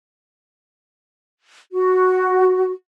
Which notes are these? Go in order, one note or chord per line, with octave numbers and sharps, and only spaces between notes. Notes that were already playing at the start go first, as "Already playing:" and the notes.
F#4